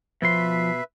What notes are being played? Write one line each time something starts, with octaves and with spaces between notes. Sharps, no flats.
B2 F3 B4 E5 C6